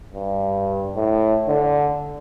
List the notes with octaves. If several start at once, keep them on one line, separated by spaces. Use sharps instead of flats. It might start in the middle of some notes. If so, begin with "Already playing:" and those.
G2
A2
D3